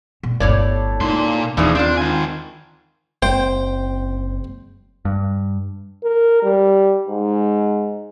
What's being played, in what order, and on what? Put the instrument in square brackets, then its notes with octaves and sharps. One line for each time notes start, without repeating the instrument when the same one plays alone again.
[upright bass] A#2
[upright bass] G1 D2 [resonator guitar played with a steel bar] A2 C#5 D5
[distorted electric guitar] A#2 C6 [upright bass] D#4
[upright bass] D#2 [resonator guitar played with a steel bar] E3 F3 D#4 [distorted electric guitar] D4 G#4
[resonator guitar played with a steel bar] C4 F4 [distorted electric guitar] D4
[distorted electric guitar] D#3 G#5
[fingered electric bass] F#1 C4 [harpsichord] C5 G5
[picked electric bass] G2
[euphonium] A#4
G3
G#2